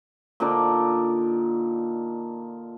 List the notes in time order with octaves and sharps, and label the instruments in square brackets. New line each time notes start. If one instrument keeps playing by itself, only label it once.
[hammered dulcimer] A#2 D3 D#4 D5